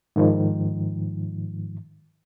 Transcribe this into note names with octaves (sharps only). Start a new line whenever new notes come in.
G#2 D#3 F3